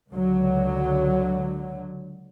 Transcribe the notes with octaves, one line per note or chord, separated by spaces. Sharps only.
C#2 D3 F#3